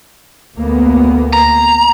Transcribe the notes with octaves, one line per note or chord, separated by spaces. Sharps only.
D2 A#3 B3
A#5